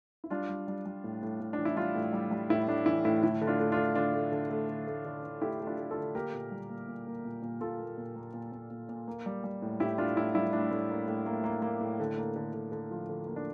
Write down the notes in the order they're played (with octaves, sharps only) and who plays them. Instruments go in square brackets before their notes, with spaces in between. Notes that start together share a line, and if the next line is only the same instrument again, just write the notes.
[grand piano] E4
G3 D4 F4
G3
G3
G3
A2
A2
A2
D4
E3
E4
G3 D4 F4
A2
G3
G3
A2 E4
A2 D4
E3 E4
A2 E4
D3 E4
D3
D4 F4
A3
D4 F4
D3
D3 D4 F4
A3
D3
A3
D3
A3
D3
D3
A3 E4 G4
A3
D4 F4
A3
F4 A4
D3
A#3 G4 A#4
A#2
G3
A#3
A#2
A#3
A#2
A#2
A#2 F4 A4
A#3
A#2
A#3
A#2
A#2
A#2
A#2
A#3
G3
G3
A2
A2 E4 G4
A2 D4 F4
A2 E4
G3 E4
A2 D4
A2
A#3
A2
A#3
A#3
A#3
A2
D3
A#3
D3
D3
D3
F3
D3
A#3
D4